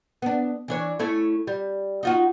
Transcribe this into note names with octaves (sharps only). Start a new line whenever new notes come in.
B3 D4
E3 D4 C#5
A3 C#4 E4
G3
D#4 F4 F#4